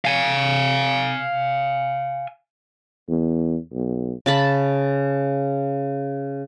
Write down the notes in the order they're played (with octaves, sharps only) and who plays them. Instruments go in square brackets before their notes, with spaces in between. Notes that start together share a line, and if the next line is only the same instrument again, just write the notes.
[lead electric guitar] F5 G#5
[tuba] E2
B1
[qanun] C#3 A5 B5